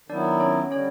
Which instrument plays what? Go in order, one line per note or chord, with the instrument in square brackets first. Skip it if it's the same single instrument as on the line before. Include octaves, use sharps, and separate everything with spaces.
[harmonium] D#3 F#3 B3 E4 [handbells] D4 D5
[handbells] C#4 C#5
[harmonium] D3 G3 [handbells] C#4 C#5